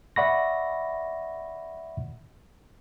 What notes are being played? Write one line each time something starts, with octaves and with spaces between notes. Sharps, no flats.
D5 E5 F#5 B5 C#6 A#6